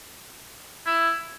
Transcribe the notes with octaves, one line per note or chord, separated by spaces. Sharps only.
E4